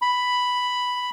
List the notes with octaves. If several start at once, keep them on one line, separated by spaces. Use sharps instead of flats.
B5